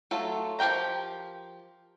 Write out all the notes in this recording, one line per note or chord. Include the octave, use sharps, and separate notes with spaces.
F#3 A3 F4 A4
F3 G4 A#4 G5 A#5